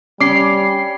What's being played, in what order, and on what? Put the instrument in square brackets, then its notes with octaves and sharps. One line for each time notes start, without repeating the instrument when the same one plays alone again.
[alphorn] G3 [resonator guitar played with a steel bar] C#4 [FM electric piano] D6 C7